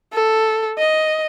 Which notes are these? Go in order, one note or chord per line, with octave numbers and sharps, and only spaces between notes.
A4
D#5